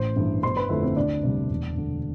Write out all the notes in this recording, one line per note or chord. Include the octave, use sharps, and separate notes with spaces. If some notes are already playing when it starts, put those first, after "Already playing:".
Already playing: A1 C5 C6
G2 E3
G1 C5 C6
B4 B5
F2 D3 A3 E4 E5
C4 C5
D2 D4 D5
C3 G3
E1
D2 D3